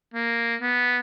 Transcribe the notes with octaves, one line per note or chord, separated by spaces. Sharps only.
A#3
B3